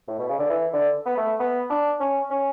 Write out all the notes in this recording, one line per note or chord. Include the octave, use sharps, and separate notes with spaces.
A2
B2
C#3
D3
E3
D3
B3
A3
B3
D4
C#4
C#4